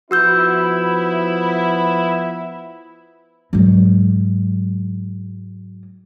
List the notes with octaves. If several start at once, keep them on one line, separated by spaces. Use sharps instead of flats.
F3 B3 E4 F#4 E6 G6
G#2 F#3